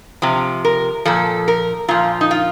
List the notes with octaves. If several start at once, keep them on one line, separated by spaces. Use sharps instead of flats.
C3 F3
A#4
A#2 F3 A4
A#4
A#2 F3 F4
D#4
F4